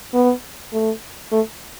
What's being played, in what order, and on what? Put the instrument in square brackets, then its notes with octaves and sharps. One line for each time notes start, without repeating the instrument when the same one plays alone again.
[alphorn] B3
A3
A3